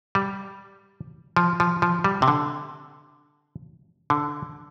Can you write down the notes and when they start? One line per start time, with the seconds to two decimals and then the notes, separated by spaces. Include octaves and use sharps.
0.15 G3
1.36 F3
1.60 F3
1.82 F3
2.04 G3
2.22 C3
2.28 D3
4.10 D3